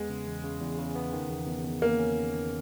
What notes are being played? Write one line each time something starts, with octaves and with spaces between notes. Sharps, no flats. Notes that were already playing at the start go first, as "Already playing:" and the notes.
Already playing: E2 G#3 B3
C#3
E2
C#3
E2
C#3
B3
D#3
E2
E2
E2
A#3 C#4
C#4
D#3
D#3